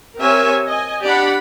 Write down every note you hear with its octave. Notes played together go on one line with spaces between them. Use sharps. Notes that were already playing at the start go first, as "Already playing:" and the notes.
C4 G4 A#4 C#5 E5 G#5
D#5 G#5
D4 G4 D5 F#5 B5